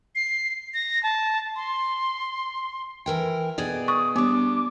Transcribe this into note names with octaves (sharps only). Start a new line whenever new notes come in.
C7
A#6
A5
C6
E3 A#4 G5
B2 G#4 D5
C#6 D#6
G3 B3 D4 D6